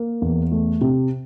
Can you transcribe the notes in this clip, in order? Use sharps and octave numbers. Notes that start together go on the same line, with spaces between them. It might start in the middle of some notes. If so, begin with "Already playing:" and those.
Already playing: A#3
E2
A3
C3